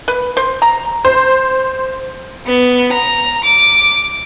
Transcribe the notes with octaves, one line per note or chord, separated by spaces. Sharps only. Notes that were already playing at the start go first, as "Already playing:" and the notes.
B4
C5
A#5
C5
B3
A#5
D6